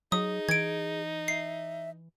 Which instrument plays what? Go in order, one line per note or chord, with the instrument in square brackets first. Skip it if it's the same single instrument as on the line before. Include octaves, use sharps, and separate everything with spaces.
[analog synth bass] F#3 [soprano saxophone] D#4 [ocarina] G#4 [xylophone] D#6
[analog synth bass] E3 [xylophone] G#6 D7
[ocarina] E5 [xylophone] C7